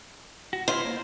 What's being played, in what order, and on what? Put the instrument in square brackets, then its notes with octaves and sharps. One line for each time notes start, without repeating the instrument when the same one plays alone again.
[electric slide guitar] F#4
[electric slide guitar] E4 F4 [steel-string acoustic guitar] C5
[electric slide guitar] A#3